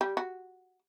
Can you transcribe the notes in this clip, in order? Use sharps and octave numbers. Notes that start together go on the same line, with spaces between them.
G3
F#4